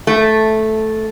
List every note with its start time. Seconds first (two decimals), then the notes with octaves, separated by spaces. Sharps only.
0.07 A3